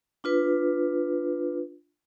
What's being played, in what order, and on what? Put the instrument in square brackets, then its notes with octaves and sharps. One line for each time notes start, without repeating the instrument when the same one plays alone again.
[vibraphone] D4 F4 B4